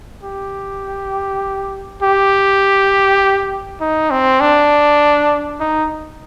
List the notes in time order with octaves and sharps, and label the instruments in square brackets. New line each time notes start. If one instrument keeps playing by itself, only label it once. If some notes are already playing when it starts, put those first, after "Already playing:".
[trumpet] G4
G4
D#4
C4
D4
D#4